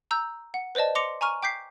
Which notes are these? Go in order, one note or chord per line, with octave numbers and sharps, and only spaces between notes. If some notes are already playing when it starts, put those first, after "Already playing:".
A#5 E6 G6
F#5
B4 C5 D5 D#5 A5
C6 D6 A#6 C#7 F7
G#5 A#5 C#6 F6 D#7
G5 D6 G6 B6 C7